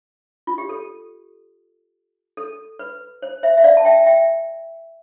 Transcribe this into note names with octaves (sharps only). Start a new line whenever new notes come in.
F4
G4
A4
A4
B4
C5
C5 E5
E5
D5 F5
A5
E5 G5
E5 G5